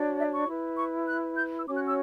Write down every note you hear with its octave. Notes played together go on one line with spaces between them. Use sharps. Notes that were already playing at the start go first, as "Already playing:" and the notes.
Already playing: D4 F#4 C#5
E5
C#6
E4 B4
C#6
F#6
G6
E6
C#4 F#4 C#5 D6
F#6
E6